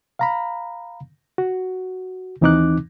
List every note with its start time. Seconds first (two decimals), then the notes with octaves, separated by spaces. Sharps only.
0.19 F5 A#5 B5
1.38 F#4
2.41 D#2 E3 C4 D#4 D6 F#6